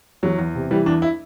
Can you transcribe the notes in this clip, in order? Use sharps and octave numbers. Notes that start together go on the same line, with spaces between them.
E2 F#3
E2
C3
E3 G3
E2 D4
E4